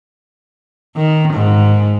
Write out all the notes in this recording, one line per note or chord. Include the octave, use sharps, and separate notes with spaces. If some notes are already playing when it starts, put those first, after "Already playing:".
D#3
G#2